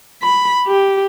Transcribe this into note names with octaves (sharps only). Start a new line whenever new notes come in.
B5
G4